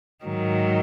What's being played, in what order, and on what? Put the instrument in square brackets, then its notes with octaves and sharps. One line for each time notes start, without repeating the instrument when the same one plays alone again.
[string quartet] G#2 D#3 F#3